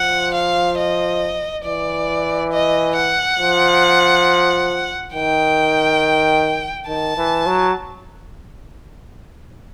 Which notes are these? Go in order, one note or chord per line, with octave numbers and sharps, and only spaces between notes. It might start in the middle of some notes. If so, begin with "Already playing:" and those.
Already playing: F3 F#5
F5
D#5
E3 D5
D#5
F#5
F3
D#3 G5
D#3 A5
E3
F#3